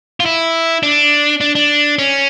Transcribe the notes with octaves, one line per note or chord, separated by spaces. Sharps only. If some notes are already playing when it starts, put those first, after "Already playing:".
F4
E4
D4
D4
D4
C#4